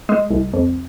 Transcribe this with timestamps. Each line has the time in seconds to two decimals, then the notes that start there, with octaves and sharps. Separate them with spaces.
0.09 G#3
0.30 C2
0.53 F2